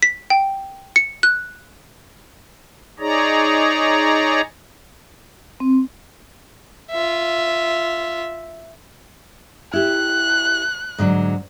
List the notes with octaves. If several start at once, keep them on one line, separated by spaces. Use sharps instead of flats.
B6
G5
C#7
F#6
D#4 G#4 C#5 D5 A#5
C4
F4 E5
E4 G4 F#6
G#2 D3 F#3